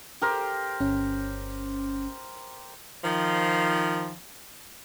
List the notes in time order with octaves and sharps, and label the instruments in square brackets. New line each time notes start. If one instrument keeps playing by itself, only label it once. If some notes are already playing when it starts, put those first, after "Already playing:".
[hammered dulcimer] G4 A#4 C5
[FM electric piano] G1 C#4
[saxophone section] D#3 F3